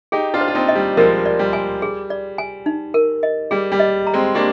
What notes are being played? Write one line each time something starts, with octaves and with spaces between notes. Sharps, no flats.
D#4 G4 G#4
D4 F4
C5
F4
C4 D#4
D#5
G3
F3 G#3 A#4
D5
G3
G#5
G#4
D5
G#5
D#4
A#4
D#5
G3 G#4
G3
D#5
A#5
G#3 C4
A#3 D4 G4